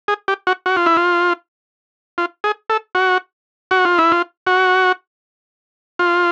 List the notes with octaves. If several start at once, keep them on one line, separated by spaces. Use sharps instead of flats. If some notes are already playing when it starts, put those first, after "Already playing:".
G#4
G4
F#4
F#4
F4
E4
F4
F4
G#4
A4
F#4
F#4
F4
E4
F4
F#4
F4